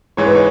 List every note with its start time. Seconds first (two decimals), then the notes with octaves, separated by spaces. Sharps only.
0.17 G#2 E3 G#3 C#5
0.26 B4
0.35 C#5